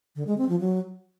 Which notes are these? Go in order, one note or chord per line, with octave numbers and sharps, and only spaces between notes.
D3
G#3
C4
F3
F#3